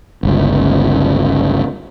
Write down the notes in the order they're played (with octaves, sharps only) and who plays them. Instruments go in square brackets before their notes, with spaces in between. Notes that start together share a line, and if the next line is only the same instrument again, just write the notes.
[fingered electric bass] G1 C#2